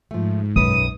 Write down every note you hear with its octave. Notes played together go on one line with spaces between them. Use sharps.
G#2 F3 A3
B1 F#2 B4 D#6